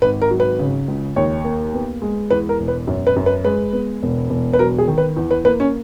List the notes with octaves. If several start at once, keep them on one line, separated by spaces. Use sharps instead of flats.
G#1 B4
A#4
F#3
B4
C#3
C#2
D#2 C#5
A#3
B3
G#3
E2 B4
A#4
E1
B4
F#2
B4
F#2
B4
G#3 B4
B3
E1
E1
B4
F#3 A#4
G#4
D#3
B4
E2
B4
A#3 B4
C#4